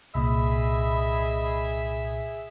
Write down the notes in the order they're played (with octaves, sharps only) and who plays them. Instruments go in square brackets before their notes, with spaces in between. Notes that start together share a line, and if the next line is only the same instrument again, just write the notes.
[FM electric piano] C2 A#2 [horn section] G#4 E5 [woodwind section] D#5 B5